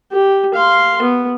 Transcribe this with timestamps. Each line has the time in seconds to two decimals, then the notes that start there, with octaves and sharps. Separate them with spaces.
0.12 G4
0.54 F5 C6
1.02 B3